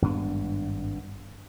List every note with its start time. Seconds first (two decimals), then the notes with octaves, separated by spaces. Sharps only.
0.02 G#1 G2 B3 D4